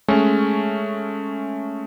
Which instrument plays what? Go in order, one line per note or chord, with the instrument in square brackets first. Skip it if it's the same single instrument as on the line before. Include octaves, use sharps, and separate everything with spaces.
[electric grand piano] G#3 A3 C#4